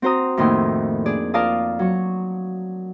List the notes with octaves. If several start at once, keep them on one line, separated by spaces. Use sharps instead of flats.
C4 F#4 C5 A#5 D#6
F2 A2 D#3 A#3 C6 D#6
D4 G#4 D5
F4 A#4 D5 F5 A5 D#6
F#3 C#6